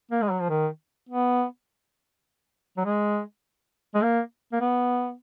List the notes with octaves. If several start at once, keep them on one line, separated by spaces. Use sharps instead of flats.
A#3
G#3
F#3
F3
D#3
B3
F#3
G#3
G#3
A#3
A#3
B3